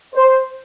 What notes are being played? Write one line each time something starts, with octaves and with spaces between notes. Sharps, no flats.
C5